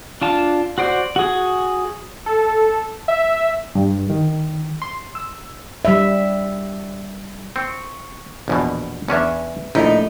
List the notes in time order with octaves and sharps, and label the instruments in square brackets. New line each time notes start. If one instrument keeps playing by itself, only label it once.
[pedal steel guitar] D4 F4 A5
F#4 C5 D5
F#4 G#4
[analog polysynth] A4
E5
[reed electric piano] G2
D#3
C6
E6
[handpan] G3 E5
[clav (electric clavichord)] C4 [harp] C#6 D7
[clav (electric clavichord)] A#1 E2 B2
[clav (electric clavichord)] E2 C#4 D4 [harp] B4 E5
[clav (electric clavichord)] A#1 [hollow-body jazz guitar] A3 E4 D#5 [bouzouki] D#4